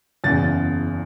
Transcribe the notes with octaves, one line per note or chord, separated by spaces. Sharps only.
F#1 E2 C#3 A6